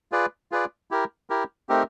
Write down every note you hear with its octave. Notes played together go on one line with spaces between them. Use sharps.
F4 G#4 B4 D5
F4 G#4 B4 D5
E4 G4 A#4
E4 G4 A#4
A3 C4 D#4 G4 A#4